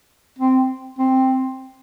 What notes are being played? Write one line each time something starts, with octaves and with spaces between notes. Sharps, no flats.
C4
C4